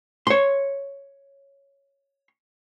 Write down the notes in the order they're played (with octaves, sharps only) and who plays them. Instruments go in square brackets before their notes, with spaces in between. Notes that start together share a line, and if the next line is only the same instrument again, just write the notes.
[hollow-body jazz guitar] C#5 C6